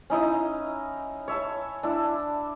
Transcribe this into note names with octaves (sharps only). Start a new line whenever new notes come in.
C#4 D#4 E4 D#5
C#5 E5 A5 C#6
D4 E4